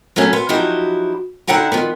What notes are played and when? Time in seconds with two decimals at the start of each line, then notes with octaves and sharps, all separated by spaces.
0.16 F#3 A3 B3 C#4
0.33 B3 C5
0.49 F3 F#3 D#4 E4 F#4 G4
1.47 D3 D#4 E4 F#5 G5 A#5
1.72 D#3 F3 B3